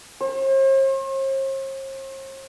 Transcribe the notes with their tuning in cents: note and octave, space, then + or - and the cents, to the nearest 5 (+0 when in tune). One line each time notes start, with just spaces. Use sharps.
C5 +45